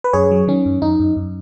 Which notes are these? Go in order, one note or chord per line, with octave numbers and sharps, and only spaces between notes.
B4
F#2 G#4 C#5
F#3
D#3 C#4
F#2
F#2 D#4
F#2
F#2